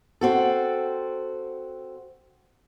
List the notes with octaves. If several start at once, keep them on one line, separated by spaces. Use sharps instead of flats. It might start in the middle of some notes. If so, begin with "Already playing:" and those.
C4 F#4 A4